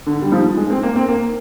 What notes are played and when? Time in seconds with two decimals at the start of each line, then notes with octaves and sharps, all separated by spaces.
0.06 D3
0.22 G3
0.32 F3
0.57 G#3
0.70 C4
0.83 A#3
0.96 C4
1.08 A#3